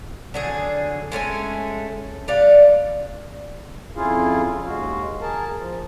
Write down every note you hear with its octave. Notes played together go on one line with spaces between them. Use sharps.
D3 F#3 G#4
G#3 A3 C#4 G#5
G3 D5 F5 F#5
F2 C#4 E4 F4 G#4 F5
D#2 G#3 F#4 F5
G#4 A#4 A5
F3